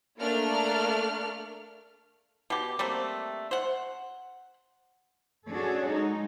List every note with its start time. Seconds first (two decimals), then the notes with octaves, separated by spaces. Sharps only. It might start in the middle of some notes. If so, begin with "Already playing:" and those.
0.18 A3 A#3 D4 D5 F6
2.50 B2 G4
2.79 G3 A3 A#3 C4
3.51 C5 F#5
5.50 C#4 D4 F#4 G#4 A4 C#5
5.90 G#3 D#4